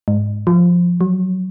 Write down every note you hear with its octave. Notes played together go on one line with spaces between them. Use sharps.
G#2
F3
F#3